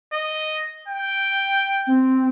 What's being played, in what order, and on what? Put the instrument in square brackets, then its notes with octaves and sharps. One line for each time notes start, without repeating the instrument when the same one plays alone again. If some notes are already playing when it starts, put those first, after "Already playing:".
[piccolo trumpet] D#5
G5
[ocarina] C4